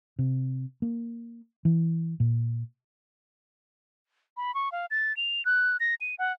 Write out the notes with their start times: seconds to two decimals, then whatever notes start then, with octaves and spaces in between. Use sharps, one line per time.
0.19 C3
0.82 A#3
1.65 E3
2.20 A#2
4.37 B5
4.55 C#6
4.72 F5
4.91 A6
5.17 F7
5.45 F#6
5.80 A#6
6.01 D#7
6.19 F#5